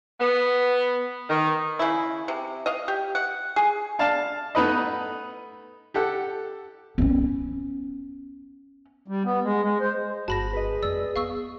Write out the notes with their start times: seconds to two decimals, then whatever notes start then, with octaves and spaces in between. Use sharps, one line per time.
0.21 B3
1.30 D#3
1.79 C#3 E4
2.28 C3
2.66 D#5 F5
2.88 G4
3.15 F#5
3.56 G#4
3.99 D4 F5 A5
4.55 A3 B3 D#4 B4 D#5
5.94 G4 A4 F#5
6.98 B3 C#4
9.08 G3
9.25 B3
9.43 G#3
9.63 G#3
9.80 C5
10.28 G1 F#4 G#4 A5 B5 A#6
10.53 G#4 B4 D#5
10.83 F2 A3 D5 E6
11.16 B3 F5 C#6 E6